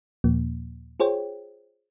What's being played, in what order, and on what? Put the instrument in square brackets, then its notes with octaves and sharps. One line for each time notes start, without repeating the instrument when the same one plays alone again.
[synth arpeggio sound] D#2 A#2 F3 A#3
F4 G#4 C5 C#5 G5